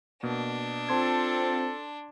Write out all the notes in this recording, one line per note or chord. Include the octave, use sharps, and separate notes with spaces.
B2 A#3 D4
C4 F4 A4 A5 C6 G#6